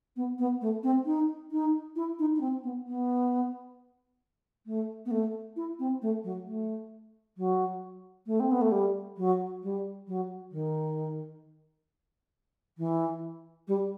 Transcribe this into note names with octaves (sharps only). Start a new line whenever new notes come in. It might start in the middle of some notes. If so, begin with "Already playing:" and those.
B3
B3
A3
C4
D#4
D#4
E4
D#4
D#4
C4
B3
B3
A3
B3
A3
E4
C4
A3
F#3
A3
F#3
A3
C4
B3
A3
G3
F#3
G3
F#3
D#3
E3
G3